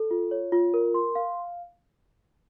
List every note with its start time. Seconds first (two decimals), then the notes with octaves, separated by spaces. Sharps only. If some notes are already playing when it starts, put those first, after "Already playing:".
Already playing: A4
0.11 F4
0.31 C#5
0.52 F4
0.74 A#4
0.94 C6
1.15 F5